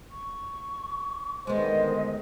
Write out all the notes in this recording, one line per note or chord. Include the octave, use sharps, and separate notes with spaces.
C#6
D3 D#3 G#3 B3 C5 D#5